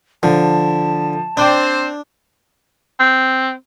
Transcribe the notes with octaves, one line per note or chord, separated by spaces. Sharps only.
D3 F3 A5
C4 D4 C5 D5 G5 D6
C4